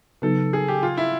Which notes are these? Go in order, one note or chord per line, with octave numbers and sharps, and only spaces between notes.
C#3 F#3 B3 D#4 F#4 A4
G#4
G4
F4
E4